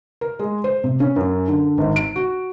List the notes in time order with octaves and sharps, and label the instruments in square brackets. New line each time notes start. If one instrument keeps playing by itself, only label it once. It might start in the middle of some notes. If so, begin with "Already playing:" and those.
[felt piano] A#4
G#3
C5
C3
C#4
F#2
D3
G#1
D7
F#4